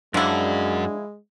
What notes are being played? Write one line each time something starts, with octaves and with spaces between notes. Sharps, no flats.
F#2 F3 G#3 D4 E4 F#4